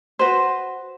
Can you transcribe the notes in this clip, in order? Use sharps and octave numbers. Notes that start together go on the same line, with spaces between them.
F#4 B4 C5